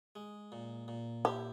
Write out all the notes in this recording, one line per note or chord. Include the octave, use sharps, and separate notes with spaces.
G#3
A#2
A#2
E4 G4